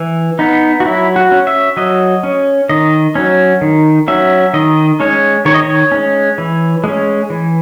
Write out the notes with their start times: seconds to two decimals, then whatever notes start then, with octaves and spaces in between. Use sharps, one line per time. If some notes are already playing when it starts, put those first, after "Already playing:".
Already playing: E3
0.39 B3 D#4
0.80 F#4
0.85 F#3 E4
1.16 F#4
1.32 C#4
1.47 E5
1.77 F#3 D#5
2.23 C#4
2.69 D#3 D#5
3.15 F#3 C#4
3.61 D#3
4.08 F#3 C#4 E5
4.54 D#3 D#5
5.00 G#3 C#4 C#5
5.45 D#3 C#5
5.54 D#5
5.63 C#5
5.92 G#3 C#4
6.38 E3
6.84 G#3 C#4
7.30 E3